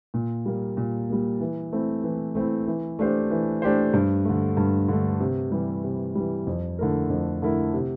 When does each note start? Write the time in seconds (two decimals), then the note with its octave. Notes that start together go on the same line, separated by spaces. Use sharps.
0.14 A#2
0.46 G3 A#3
0.77 A#2
1.09 G3 A#3
1.40 E3
1.72 A3 C4 E4
2.04 E3
2.35 A3 C4 E4
2.67 E3
2.99 A3 D4 G4 C5
3.30 E3
3.62 A3 D4 G4 C5
3.94 G2
4.25 D3 A3
4.57 G2
4.88 D3 A3
5.20 C3
5.52 E3 G3
5.84 C3
6.15 E3 G3
6.47 F2
6.79 D3 A3 E4 A#4
7.10 F2
7.42 D3 A3 E4 A#4
7.74 C3